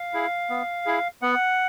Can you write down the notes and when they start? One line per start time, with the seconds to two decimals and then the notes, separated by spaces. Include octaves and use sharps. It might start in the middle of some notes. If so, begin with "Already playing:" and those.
Already playing: F5
0.14 E4 G#4
0.50 B3
0.86 E4 G#4
1.22 B3 F#5